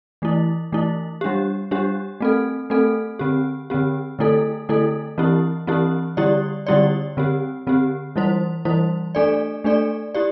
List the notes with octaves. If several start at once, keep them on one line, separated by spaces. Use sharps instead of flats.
E3 A3 E4
E3 A3 E4
G3 D4 G4
G3 D4 G4
A3 C4 A4
A3 C4 A4
D3 C4 G4
D3 C4 G4
D3 A3 E4 A4
D3 A3 E4 A4
E3 C4 E4 G4
E3 C4 E4 G4
D3 G3 E4 G4 D5
D3 G3 E4 G4 D5
D3 C4 G4
D3 C4 G4
E3 G3 E4 C5
E3 G3 E4 C5
A3 D4 A4 D5
A3 D4 A4 D5
E4 G4 D5